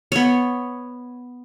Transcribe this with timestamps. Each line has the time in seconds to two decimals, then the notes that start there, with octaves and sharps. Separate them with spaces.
0.12 B3 C#5